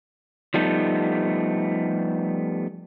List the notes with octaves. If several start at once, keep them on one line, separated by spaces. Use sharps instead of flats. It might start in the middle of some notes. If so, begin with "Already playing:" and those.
F3 G3 A3 B3 D#4